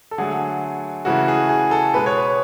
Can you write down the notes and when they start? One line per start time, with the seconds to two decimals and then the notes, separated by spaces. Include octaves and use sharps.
0.11 A4
0.18 D3 F#3 A3 G#4
1.05 C#3 E3 A3 F#4
1.28 G#4
1.49 G#4
1.71 A4
1.94 B2 G#3 B3 B4
2.06 C#5
2.18 B4